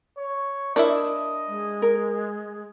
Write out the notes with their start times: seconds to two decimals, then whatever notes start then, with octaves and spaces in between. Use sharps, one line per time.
0.18 C#5
0.76 D4 E4 A#4 C#5 D#5 E5
1.48 G#3
1.82 A#4